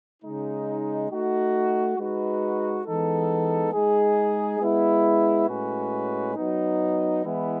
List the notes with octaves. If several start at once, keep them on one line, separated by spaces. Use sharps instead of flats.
C#3 G#3 D#4
A3 D#4 F#4
G#3 D#4 F#4 B4
E3 G#3 B3 D#4 A4
G#3 D#4 G#4
G#3 B3 E4
A2 G#3 C#4 F#4 B4
F#3 B3 D#4
E3 G#3 B3 E4